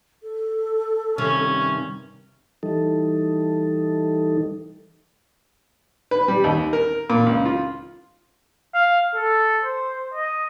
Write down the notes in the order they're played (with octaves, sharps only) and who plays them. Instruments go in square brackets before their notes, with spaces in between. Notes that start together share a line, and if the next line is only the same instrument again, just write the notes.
[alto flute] A4
[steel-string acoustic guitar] G2 C3 D#3 [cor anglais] C#4
[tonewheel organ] E3 G3 D#4 A4
[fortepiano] B4
G3
D#2
A#4
A#2
C#2
F4
[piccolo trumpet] F5
A4
C5
D#5